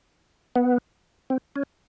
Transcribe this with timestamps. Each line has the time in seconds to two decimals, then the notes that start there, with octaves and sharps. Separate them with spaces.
0.56 B3
1.30 C4
1.56 C#4